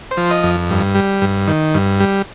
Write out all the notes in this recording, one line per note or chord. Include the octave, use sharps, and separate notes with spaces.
C5
F3
D#5
F2
G2
G3
G2
D#3
G2
G3